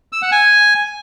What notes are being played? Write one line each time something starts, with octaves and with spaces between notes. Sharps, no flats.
E6
F#5
G#5